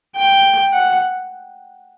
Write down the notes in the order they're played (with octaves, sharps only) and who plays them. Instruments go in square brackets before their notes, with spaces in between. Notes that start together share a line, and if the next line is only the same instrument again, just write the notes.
[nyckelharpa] G5
F#5